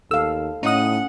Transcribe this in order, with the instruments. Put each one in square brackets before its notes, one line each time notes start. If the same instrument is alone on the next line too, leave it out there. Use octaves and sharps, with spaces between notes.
[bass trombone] D#2 [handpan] A4 F5 [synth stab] E6
[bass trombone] A2 [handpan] C#4 [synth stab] D#4 D#6 [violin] F#5